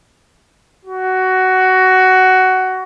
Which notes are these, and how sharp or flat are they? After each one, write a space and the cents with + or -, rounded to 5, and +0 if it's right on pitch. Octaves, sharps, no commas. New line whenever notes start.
F#4 +15